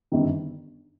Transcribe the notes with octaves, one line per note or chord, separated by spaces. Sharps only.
G1 F#2 D#3